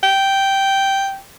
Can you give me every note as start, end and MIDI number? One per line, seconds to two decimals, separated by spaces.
0.03 1.19 79